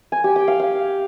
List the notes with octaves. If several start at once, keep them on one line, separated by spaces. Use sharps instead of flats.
G#5
G4
G5
F5
F5